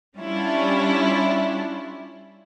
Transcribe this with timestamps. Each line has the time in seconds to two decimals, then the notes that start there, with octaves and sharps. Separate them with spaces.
0.18 G3 C#4 D4 E4 F4